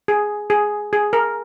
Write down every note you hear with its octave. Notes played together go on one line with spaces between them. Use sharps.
G#4
G#4
G#4
A#4